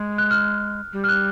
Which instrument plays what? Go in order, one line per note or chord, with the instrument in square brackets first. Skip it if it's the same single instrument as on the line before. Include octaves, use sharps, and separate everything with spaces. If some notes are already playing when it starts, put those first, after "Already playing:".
Already playing: [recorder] G#3
[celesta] F#6
F6
[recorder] G3
[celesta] F6
F#6